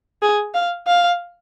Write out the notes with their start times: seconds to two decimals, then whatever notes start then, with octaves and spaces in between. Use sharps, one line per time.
0.22 G#4
0.54 F5
0.87 F5